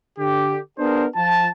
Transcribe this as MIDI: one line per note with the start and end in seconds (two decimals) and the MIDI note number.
0.19 0.59 50
0.19 0.59 67
0.79 1.05 59
0.79 1.05 62
0.79 1.05 68
0.79 1.05 70
0.79 1.05 72
1.16 1.49 53
1.16 1.49 65
1.16 1.49 81